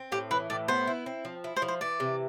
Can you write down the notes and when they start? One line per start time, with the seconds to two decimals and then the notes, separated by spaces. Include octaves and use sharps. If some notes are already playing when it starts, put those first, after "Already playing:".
Already playing: C4
0.12 A2 G4
0.31 E3 B4
0.50 A2 D5
0.68 B3 C5
0.87 E4
1.06 C4
1.25 F3
1.44 E4
1.56 C5
1.62 F3
1.68 C5
1.81 E3 D5
2.00 C3